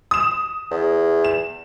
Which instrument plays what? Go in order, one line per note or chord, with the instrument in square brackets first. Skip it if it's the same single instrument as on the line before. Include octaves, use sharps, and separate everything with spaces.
[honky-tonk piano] D#6 E7
[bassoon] E2
[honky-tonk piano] E7